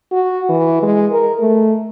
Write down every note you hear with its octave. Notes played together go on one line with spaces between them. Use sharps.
F#4
E3
G#3
A#4
A3